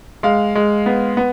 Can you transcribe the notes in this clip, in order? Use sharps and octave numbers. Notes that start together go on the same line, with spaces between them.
G#3 F5
G#3
B3
B3